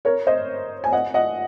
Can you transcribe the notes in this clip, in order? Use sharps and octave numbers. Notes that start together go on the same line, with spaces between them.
A#4 C#5
C5 D#5
G#5
D#5 F#5
D#5 F#5